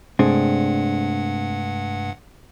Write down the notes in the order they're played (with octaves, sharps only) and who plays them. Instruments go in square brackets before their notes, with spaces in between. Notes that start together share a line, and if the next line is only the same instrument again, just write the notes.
[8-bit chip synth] G2 F#5 [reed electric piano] C3 G#3 A3 [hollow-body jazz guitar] C4 D4 G#4